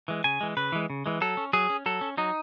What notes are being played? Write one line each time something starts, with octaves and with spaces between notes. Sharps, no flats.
E3 G#3
C#3 G#5
E3 G#3
C#3 B4
E3 G#3
C#3
E3 G#3
F#3 A4
C#4
F#3 G#4
C#4
F#3 A4
C#4
F#3 D#4